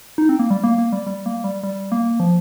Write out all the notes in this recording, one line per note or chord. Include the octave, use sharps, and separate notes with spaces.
D#4
C4
A#3
G3
A#3
A#3
G3
G3
A#3
G3
G3
A#3
F3